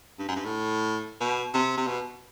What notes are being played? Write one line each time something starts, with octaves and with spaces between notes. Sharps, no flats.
G2
F#2
G2
A2
B2
C3
C3
B2